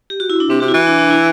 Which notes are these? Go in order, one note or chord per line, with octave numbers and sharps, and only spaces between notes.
G4
F#4
E4
D4
C3 C4
C3 F#4
E4
E3
D4
D4
E4